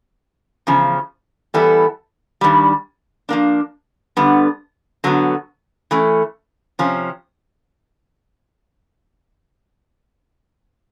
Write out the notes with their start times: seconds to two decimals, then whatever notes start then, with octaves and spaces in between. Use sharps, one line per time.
0.67 E2 C#3 F3
1.54 E3 G3 B3 E4 A4
2.41 G2 D#3 G3
3.29 F3 A#3 D4
4.17 G2 D3 G3 B3
5.04 D3 F#3 B3
5.91 E3 A3 C#4
6.79 C3 F3 C#4